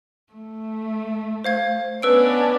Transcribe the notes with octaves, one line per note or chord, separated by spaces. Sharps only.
A3
C5 F5 G#6
B3 C#4 D4 B4 E6 D7